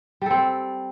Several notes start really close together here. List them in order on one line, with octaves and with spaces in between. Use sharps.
G3 A4 C4